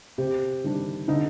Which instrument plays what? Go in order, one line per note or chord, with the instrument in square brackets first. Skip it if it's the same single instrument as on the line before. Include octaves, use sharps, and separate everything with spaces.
[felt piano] C3 G4
D#3 G3 D4
D3 D#4